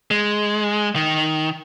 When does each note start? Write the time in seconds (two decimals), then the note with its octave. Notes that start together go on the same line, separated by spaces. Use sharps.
0.11 G#3
0.96 D#3